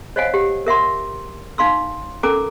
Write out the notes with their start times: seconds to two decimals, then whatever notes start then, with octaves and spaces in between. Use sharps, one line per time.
0.16 C5 C#5 D#5 F5 F#5 G#5
0.34 G4 F#5
0.67 A#4 E5 F#5 C6
1.58 D#4 F5 C6 E6
2.23 C#4 A4 A#4 G#5 A#5 D6